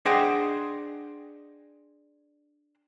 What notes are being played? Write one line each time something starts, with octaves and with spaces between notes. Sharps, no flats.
D4 G#4 C5 D#5 F#5 G5